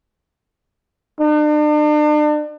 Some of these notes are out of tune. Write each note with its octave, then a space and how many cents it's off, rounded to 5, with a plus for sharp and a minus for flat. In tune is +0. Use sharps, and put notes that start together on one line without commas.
D4 +40